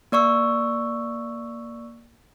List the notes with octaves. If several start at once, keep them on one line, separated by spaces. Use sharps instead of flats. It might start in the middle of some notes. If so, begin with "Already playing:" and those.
A#3 D5 C#6 E6